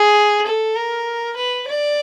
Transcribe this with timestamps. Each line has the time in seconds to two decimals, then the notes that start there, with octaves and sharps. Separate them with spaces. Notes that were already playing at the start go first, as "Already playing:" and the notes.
Already playing: G#4
0.46 A4
0.77 A#4
1.36 B4
1.67 D5